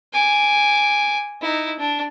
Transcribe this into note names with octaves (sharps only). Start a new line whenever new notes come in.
G#5 D6
D#4 E4
D4